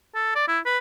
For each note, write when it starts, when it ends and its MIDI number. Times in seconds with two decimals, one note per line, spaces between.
0.15 0.34 69
0.35 0.44 74
0.48 0.59 64
0.66 0.78 71